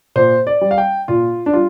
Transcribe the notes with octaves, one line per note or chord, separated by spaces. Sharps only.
A#2 C5
D5
G3
F5
G5
A#2 F4
D4
G3 F4